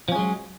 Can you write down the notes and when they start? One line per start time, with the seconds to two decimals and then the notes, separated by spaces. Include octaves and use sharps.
0.09 F3
0.12 C#4
0.15 G#3
0.19 F#3